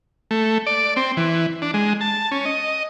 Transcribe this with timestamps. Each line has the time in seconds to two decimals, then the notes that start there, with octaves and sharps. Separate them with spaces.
0.31 A3
0.67 D5
0.96 C4
1.17 E3
1.62 D4
1.74 G#3
2.01 A5
2.31 C#4
2.45 D#5